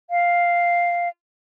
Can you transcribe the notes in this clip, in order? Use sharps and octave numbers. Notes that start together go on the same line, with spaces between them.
F5